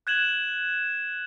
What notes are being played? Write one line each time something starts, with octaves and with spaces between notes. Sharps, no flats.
F#6 G#6 E7 F#7